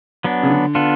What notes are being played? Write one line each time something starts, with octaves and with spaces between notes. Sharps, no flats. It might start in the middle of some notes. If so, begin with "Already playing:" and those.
F#3 B3 D4
C#3
D3
B3 D4 F4 A4